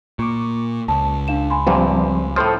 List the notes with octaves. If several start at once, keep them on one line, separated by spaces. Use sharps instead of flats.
A#2 C#6 D6
C#2 A5
D4 F5 E7
G#5 B5 C6
E2 G2 A#2 F3 G3 C4
A2 F3 A4 C5 D#6